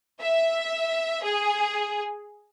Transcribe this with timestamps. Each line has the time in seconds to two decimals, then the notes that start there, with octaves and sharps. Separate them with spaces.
0.21 E5
1.22 G#4